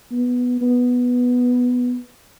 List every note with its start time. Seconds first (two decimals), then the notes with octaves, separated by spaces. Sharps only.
0.12 B3
0.61 B3